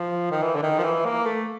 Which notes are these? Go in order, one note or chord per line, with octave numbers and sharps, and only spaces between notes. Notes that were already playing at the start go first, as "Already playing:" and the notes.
Already playing: F3
D#3
E3
D3
D#3
F3
E3
A#3
A3